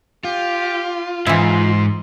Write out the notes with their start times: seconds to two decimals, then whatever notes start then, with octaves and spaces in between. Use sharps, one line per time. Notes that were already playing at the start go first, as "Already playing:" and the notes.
0.24 F4 G4
1.27 G#2 E3 E4 C6